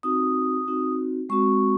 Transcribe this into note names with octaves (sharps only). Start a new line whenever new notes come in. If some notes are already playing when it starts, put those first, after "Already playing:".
C4 D#4 F#4 D#6
C4 D#4 F#4
G#3 C4 F#4 C#6